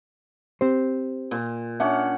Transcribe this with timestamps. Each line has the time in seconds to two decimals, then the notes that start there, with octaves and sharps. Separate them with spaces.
0.61 C4 G4 C5
1.31 A#2
1.80 C#4 D4 E5 F#5